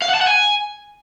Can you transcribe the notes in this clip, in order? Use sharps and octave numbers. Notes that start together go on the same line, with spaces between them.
F5
F#5
A5
F#5
G#5